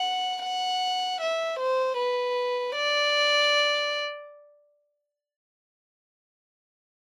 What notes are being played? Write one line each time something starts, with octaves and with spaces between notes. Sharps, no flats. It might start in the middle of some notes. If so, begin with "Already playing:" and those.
Already playing: F#5
F#5
E5
C5
B4
D5